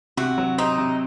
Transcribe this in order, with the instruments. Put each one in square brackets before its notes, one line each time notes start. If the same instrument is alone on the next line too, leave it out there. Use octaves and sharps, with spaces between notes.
[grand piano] C3 [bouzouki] F#4
[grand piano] F#3
[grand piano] C4 [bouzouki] D#4
[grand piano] C3